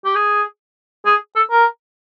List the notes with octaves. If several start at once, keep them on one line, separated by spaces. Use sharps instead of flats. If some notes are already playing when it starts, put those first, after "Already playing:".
G4
G#4
G#4
A4
A#4